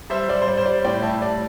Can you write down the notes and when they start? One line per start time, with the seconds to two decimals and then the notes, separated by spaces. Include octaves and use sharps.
0.10 G3 C5 E5
0.29 G3 D5
0.42 C5
0.47 G3 D5
0.57 C5
0.66 G3 D5
0.85 A2 D5 G5
1.02 A2 E5 A5
1.22 G3 D5